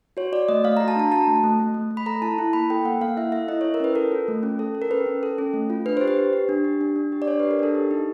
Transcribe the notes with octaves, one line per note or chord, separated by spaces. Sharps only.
F#4 C#5
F#4 D5
A3 D#5
A3 F5
A#5
F#4
A5
D4 A#5
F#4 A5
A3
A3
A3
A3
A3
B5
A4 A#5
E4 A5
E4
A#3 B5
A4 G5
A#3 F#5
A#3 F5
E4 E5
A4 E5
E4 D#5
C#5
E4
A#4
C#4 B4
A4 A#4
F4
A3
C#4
A4
A4
A#4
C#4 B4
C#4
A4
C#4
A3
F4
D4 B4
G4 C5
B4
G4
G4
D4
G4
D4
D4
G4
D5
D4 C#5
B4
G4
A#4
D4 A4
G4
D#4